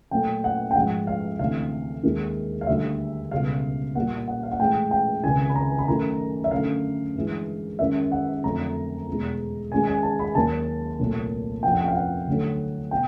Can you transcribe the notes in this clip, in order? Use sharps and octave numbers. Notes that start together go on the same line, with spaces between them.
A#2 F#3 A3 G5
F#5
G5
G#2 F3 G#3 F#5
F5
D2 C3 E3 F5
D#2 D#3 G#3
F5
D2 D3 G3 E5
C#2 B2 G3 F5
A#2 G3 F#5
F#5
F5
F#5
A2 E3 G#3 G5
G5
C#2 C3 D#3 G#5
B5
A#5
B5
F#2 D#3 F#3 A3 A#5
E5
F#2 D3 F#3 A3 F5
G2 E3 G#3
F#2 D#3 G#3 E5
F#5
F2 D3 F#3 A3 A#5
E2 B2 G#3
F#2 D#3 G#3 G#5
G#5
A5
B5
D#2 D#3 F#3 A5
C2 A#2 F#3 A3
F2 C3 F3 G5
F#5
G5
F5
F#5
D2 D3 F#3 A3
B2 G5